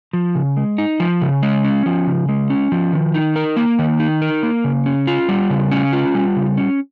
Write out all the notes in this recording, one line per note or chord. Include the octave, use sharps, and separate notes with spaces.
F3
C#3
G#3
D#4
F3
C#3
G#3
C#4
F3
C#3
G#3
C#4
F3
D#3
D#4
A#4
A#3
D#3
D#4
A#4
A#3
C#3
C#4
F4
G3
C#3
C#4
F4
G3
C#3
C#4